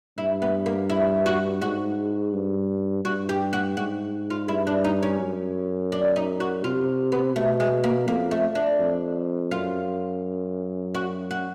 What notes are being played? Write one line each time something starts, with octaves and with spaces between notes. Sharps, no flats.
G2 E4
B3
A#3
E4
F#4
G#2 F#4
G2
G2 F#4
G4
F#4
G#2 F#4
F4
G2 E4
D4
D#4
C#4
F#2
D4
D#4
F#4
C3 F4
B3
B2 A3
G#3
A#3
F2 A#3
A3
D4
F2
F#2 F4
F#4
F#4